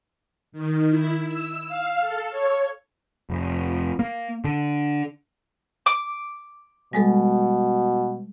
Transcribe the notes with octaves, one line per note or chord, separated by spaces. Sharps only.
D#3
E4
E6
F5
A4
C#5
F1
A#3
D3
D6
B2 G3 G#3 A4